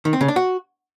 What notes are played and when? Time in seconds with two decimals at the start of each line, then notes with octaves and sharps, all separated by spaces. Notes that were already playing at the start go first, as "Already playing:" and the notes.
0.05 D#3
0.13 C4
0.21 C#3
0.28 D4
0.36 F#4